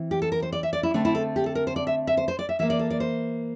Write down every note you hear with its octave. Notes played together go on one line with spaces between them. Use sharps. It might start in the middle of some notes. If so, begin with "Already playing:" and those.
Already playing: E3 C4
G4
A4
A#4
C5
D5
E5
D5
E4
D3 A3 C4 D4
E4
A4
G4
A4
A#4
C5
D5
E5
E5
C5
C5
D5
E5
E3 A#3 E5
D5
A4
D5
C5